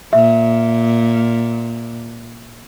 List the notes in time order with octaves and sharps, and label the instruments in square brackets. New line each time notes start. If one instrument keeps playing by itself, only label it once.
[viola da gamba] A#2 [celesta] E5